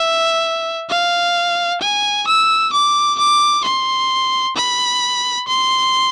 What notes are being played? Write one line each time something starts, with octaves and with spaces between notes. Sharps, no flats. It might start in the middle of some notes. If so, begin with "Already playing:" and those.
Already playing: E5
F5
G#5
E6
D6
D6
C6
B5
C6